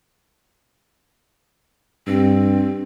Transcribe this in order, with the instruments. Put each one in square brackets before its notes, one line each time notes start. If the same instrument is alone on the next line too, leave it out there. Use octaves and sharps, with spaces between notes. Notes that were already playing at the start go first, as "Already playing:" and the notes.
[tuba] G2 [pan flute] C4